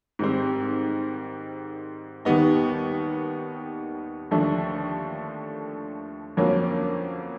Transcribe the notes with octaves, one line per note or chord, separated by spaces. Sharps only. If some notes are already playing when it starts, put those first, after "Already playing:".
G#2 D#3 G3 C4
D#2 D#3 G3 B3 D#4
D#2 D3 F3 A3 D4
F2 D3 F#3 A#3 C#4